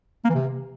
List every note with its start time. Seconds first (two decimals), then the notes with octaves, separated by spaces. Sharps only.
0.25 A#3
0.30 E3
0.35 C3